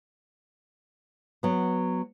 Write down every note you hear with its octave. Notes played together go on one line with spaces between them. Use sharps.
F#3 B3